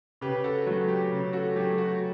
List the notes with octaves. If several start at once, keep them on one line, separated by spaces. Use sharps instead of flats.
C#3 G4 B4
F#4 A4
F#3 A3 F#4
G4
C#3
F#4 A4
F#3 A3 G4
F#4